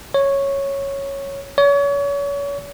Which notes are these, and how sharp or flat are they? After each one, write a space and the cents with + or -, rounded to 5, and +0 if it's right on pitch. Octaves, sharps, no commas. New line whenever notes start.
C#5 -5
C#5 +35